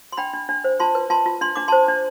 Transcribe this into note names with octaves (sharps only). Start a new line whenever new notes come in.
C6
D4 G5 B5
D4
D4
C5
F4 A5 C6
B4
F4 A5 C6
F4
D4 C6
D4 D6
C5 A5 C6
D4